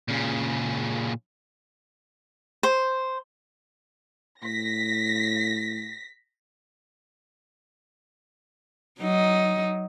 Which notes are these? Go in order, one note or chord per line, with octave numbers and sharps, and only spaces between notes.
A#2 C#3
C5
A2 A#6 B6
F#3 D#4